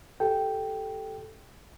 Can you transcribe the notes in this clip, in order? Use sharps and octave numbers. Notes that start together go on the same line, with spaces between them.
G4 A4 G5